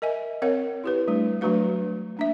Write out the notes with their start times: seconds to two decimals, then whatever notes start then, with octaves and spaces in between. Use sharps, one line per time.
0.02 A#4 D#5 E5 G#5
0.42 C4 A#4 C#5 F5
0.84 E4 G4 B4
1.08 G3 A3 D4
1.41 F#3 A3 D4 F#4 B4 F5
2.17 A#3 D4 E5